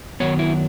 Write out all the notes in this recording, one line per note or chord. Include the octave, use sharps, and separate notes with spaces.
F#2 D#3 F#3 B3 C#5
E4